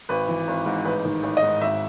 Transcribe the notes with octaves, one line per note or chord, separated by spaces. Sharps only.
G#1 B4
E3
G#1
G#2
A1 B4
D#3
A1
D#5
G#2
G#1 E5